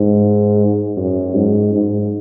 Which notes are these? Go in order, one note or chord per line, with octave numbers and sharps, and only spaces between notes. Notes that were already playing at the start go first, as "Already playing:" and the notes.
Already playing: G#2
F#2
G#2
G#2